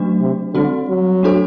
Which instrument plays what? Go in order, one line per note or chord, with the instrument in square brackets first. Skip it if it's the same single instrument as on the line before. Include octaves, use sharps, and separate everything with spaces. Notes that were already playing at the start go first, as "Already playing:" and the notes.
Already playing: [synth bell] F#3 A3 D4 F#4
[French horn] C3
[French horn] D3 [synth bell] G3 C4 F#4
[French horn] F#3
[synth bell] A3 D4 F#4 A4 C5